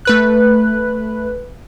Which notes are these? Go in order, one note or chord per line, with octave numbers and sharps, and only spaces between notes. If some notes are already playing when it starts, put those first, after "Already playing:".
A3 B4 F#6